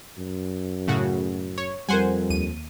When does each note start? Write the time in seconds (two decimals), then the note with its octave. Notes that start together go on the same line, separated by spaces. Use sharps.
0.18 F#2
0.87 A2 C#3 F#4
1.58 C#5
1.89 F2 G3 A#4 C5 F#5 G#5
2.30 D#2 D#7